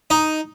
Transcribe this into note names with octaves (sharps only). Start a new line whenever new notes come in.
D#4